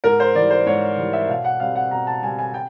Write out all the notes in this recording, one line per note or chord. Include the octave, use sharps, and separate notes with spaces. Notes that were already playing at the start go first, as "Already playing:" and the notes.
G#2 A#4
C5
E3 G3 D5
C5
G#2 C#5
E3 G3
E5
B2 F5
F#5
G3 C4 F5
F#5
B2 A#5
A5
G3 C4 G#5
G#5
G5